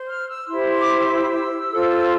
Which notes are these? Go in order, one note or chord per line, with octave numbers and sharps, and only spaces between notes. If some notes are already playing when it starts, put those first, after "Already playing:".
Already playing: C5
F6
E6
E4 G4 C5 C6
C6
D6
C6
E6
F4 A4 C5